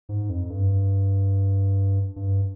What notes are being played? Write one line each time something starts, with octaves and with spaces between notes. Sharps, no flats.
G#2
F2
G2
G2